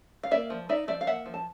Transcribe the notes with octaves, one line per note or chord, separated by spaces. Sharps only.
F5
A#3 D5 E5
F3
D#4 D5 E5
F3 D5 E5
F5
A#3 E5 F#5
F3
A5